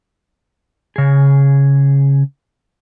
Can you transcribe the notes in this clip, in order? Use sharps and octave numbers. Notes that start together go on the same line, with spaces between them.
C#3 G#4